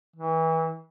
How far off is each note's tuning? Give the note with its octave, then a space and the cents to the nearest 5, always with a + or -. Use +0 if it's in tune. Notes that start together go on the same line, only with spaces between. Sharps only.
E3 -30